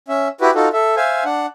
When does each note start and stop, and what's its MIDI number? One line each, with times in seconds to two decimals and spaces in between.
0.08 0.28 61
0.08 0.28 76
0.41 0.51 64
0.41 0.51 66
0.41 0.51 67
0.41 0.51 71
0.55 0.68 63
0.55 0.68 65
0.55 0.68 66
0.55 0.68 69
0.73 0.96 69
0.73 0.96 76
0.96 1.24 72
0.96 1.24 76
0.96 1.24 77
0.96 1.24 80
1.25 1.46 62
1.25 1.46 78